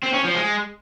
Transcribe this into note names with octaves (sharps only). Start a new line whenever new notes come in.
C4
C#4
F3
G#3